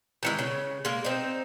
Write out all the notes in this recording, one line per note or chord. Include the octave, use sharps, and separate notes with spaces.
D#3 E3 G#3
C#3
G#3 A#3
C4 D#4